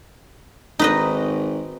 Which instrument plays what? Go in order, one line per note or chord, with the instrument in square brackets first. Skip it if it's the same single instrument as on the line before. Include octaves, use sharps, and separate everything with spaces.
[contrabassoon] G#1 [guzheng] D#4 B4 D#5